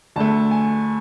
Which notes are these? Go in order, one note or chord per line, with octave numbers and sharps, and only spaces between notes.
D2 D3 A3 A5
G#5